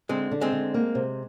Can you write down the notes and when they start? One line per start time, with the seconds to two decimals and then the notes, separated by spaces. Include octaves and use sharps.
0.09 D3 G#3 C4
0.31 D3
0.41 G#3 C4
0.52 D3
0.74 A#3
0.95 C3